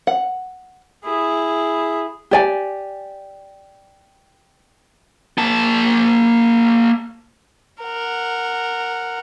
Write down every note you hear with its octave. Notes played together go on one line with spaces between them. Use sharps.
F#5
E4 G#4
G4 D5 G#5
A#3 A5
A#4 F#5